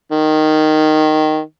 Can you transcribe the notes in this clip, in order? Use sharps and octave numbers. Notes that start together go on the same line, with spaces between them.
D#3